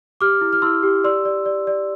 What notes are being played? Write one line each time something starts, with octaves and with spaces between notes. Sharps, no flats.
G4 D6 F6
E4
F6
E4 C6 E6
G4
D5 C6 E6
D5
D5
D5